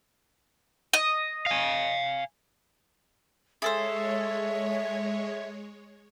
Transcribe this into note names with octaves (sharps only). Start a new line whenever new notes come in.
D#5
F5 G#5
G#3 G#4 A4 C5 C#5 E5